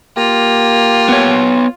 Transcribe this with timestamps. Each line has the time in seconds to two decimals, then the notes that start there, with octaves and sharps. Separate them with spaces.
0.17 A#3 F4 G4
1.09 B3 C#5